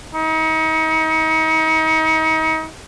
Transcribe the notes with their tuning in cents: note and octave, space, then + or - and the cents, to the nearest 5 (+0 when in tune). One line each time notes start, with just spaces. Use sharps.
D#4 +35